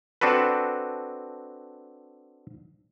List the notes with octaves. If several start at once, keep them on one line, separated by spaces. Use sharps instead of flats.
C4 D4 F#4 A4 B4